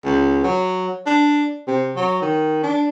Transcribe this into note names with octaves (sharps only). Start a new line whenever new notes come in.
C#2
F#3
D4
C3
F#3
D#3
D4